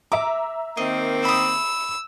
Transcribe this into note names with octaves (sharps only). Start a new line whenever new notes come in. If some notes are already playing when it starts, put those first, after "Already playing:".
E5 A#5 D6
D#3 A#3 C4 D#5
B5 D#6 E6